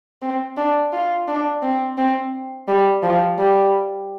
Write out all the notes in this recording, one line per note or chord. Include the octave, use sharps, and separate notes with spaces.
C4
D4
F4
D4
C4
C4
G3
F3
G3